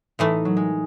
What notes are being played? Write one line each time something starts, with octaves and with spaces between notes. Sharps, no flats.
A2 E3 A3 D#4
F#3
G#3